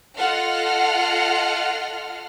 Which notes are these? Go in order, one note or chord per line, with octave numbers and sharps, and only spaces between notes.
F4 A4 D#5 F#5 F6